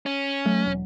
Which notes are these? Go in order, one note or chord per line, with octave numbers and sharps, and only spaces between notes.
C#4
F#3 A3
E1